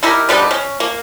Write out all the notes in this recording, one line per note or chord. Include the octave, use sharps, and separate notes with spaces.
D#4 E4 G4 A#4
D3 G3 B3 D#4
C#4
A#3